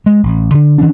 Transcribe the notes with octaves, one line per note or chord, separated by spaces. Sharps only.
G#3
A1
D3
D#3 E3 C#4 D4